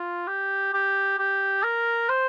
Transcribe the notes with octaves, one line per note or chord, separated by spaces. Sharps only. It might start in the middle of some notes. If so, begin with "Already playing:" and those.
Already playing: F4
G4
G4
G4
A#4
C5